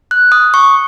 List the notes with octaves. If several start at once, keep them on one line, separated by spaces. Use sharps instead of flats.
F#6
D#6
C#6